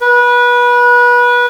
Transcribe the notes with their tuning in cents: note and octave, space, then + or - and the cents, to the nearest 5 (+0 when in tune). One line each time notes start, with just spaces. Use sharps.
B4 -25